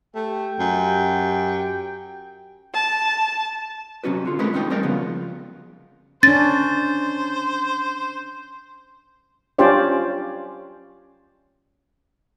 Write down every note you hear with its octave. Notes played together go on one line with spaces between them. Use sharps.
A3 G4 G5
F#2
A5
C3 F#3 C#4 F#4 B4
D3 F4
G#3 A3 C4 A#4 B4
E2 G#3 C#4 D#4 G5
G3 C4 G#4 A#4 D5 G5
C#3 F3 F#3 B3
C#4 D4 C5 A6
C#4 D4 F4 G4 C5 D5